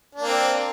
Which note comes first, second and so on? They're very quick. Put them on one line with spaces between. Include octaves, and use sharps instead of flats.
D4 A#3 C4